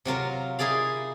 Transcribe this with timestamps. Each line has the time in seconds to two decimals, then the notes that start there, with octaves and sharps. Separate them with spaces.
0.05 C3 F#3 F4 A#4
0.59 D#4 E4 G#4 D5 F5